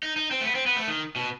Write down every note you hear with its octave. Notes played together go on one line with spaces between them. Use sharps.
D#4
D#4
C4
A3
B3
C4
B3
A3
D#3
B2